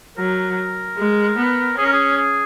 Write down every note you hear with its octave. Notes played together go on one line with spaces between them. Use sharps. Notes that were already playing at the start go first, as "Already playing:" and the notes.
F#3 A#4
G#3
B3
C#4 G#4
A#4
G#4
G#4